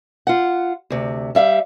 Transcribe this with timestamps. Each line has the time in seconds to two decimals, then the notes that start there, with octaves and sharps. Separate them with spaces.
0.27 F4 F#5
0.90 D2 C3
1.35 G3 E5 F5